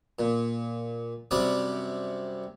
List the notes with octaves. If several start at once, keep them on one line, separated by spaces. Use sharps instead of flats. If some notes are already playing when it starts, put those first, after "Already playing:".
A#2
F#2 C3 G3 D5 D#6